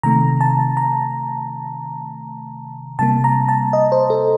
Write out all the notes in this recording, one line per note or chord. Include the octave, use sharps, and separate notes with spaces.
C3 D#3 A3 A#5
A5
A#5
C3 G3 A#3 A5
A#5
A5
D#5
C5
A4